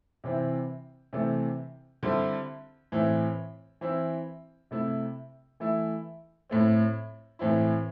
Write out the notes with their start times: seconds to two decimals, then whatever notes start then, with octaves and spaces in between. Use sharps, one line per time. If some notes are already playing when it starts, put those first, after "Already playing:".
0.24 C3 E3 C4 E4
1.13 C3 E3 A3 C4
2.03 D3 G3 C4 E4
2.92 A2 E3 C4 E4
3.81 E3 C4 E4
4.71 C3 A3 E4
5.60 E3 A3 E4
6.49 A2 A3 C4
7.39 A2 E3 C4 E4